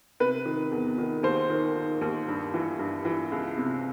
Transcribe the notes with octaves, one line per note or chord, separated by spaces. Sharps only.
C3 B4
D#3
E2
D#3
D#2 C5
D#3
D#3
D#2
G2
E3
G2
E3
C#2
C3